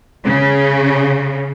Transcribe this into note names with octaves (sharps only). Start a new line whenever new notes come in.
C#3